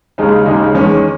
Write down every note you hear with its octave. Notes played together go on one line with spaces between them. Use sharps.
D#2 C#3 G#3 D#4
D#2 C#3 G#3 D#4
E2 D#3 G#3 C#4